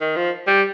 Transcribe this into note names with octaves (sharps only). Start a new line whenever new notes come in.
D#3
F3
G3